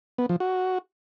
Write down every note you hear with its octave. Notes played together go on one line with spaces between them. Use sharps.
B3
F3
F#4